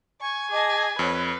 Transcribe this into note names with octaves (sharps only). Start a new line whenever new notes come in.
G#5 C#6
G#4 D#5 A5 D6
F2 B4 C#5